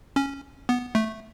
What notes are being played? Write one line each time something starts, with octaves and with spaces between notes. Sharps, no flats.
C#4
B3
A3